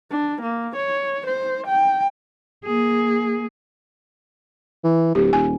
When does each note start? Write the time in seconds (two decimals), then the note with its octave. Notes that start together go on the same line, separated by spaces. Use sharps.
0.10 D4
0.41 A#3
0.76 C#5
1.27 C5
1.67 G5
2.65 A#3 G#4
4.84 E3
5.15 D1 G4
5.33 D#1 G#5